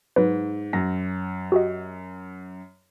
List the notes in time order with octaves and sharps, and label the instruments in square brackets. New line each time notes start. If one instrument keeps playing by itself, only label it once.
[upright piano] G#2 [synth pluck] F#3 B4
[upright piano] F#2 [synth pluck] A#6
[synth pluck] F#4 G4 D#5